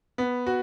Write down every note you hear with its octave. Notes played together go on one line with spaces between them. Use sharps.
B3
F#4